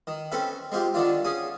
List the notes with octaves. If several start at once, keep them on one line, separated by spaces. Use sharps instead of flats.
D#3
C4 C#4 A4 B4 E5
G#3 C4 F4 G4
D3 D#3 D4 F4
C#4 G#4 D#6